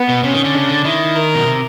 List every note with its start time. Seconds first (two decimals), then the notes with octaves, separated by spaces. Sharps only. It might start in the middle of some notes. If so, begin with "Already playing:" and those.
Already playing: B3
0.09 B2
0.23 C3 C#4
0.34 D#3
0.44 D3
0.55 C#3 D4
0.69 D3
0.84 D#3 E4
1.16 A#4
1.35 B2
1.46 C3